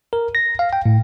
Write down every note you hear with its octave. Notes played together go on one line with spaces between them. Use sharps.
A#4
A#6
F5
G5
A2